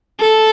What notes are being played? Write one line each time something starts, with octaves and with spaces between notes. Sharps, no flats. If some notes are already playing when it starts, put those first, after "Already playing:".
A4